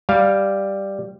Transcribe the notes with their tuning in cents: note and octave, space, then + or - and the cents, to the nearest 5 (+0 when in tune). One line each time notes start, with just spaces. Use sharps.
G3 +0 F5 +0